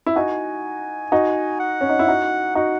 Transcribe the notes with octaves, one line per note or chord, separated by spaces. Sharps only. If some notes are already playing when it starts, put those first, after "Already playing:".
E4
D#4 F#4 G#5
D#4 F#4
F#5
C#4
D#4
E4
D#4 F#4
D#4 F#4 F#5